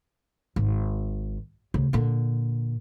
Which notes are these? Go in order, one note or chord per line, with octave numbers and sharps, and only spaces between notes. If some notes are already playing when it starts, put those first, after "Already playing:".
G#1
D2 C#3
A#2 D3